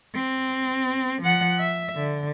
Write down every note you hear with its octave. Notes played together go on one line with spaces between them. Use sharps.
C4
F3 F#5
E5
D3